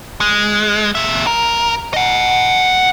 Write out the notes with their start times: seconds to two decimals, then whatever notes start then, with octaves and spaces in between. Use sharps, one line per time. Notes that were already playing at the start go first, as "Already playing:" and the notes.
0.21 G#3
0.95 A#2 E5
1.27 A#4
1.94 D#5 F#5